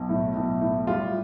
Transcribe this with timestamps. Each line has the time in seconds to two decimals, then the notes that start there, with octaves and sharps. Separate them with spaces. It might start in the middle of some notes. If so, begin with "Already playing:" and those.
Already playing: B1
0.09 A2
0.35 B1
0.61 A2
0.87 G3 F4